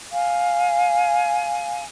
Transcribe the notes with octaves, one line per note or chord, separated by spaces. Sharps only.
F5 G#5